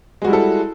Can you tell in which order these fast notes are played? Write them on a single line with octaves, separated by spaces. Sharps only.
G#3 F#4 G3 E4 A4